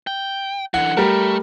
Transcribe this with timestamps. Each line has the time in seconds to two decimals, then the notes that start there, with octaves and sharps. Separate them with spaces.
0.07 G5
0.74 D3 E3 F#5
0.97 G3 A3 A#4